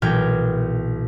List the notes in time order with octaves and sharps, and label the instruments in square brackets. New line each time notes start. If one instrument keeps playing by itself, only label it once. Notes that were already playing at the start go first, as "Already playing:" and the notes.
[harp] B1 A#2 E3 G5 F6 G#6